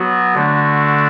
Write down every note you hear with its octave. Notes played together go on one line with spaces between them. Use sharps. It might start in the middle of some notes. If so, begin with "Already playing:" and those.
Already playing: F#3 B3 F#4
D3 A3 D4 F#4